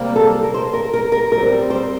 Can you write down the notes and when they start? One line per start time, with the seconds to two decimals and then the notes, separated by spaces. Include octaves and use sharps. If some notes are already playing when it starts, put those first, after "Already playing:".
Already playing: C3 G3 A#3
0.16 A4
0.43 A#4
0.54 C5
0.74 A#4
0.94 A#4
1.12 A#4
1.31 A2 G3 C4 A#4
1.70 C5